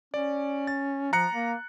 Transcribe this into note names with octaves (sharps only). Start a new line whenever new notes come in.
C#4 D5
A6
F3 A#5 F#6 C#7
A#3